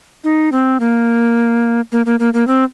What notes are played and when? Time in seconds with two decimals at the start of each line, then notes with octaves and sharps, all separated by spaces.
0.24 D#4
0.52 C4
0.80 A#3
1.92 A#3
2.06 A#3
2.20 A#3
2.34 A#3
2.47 C4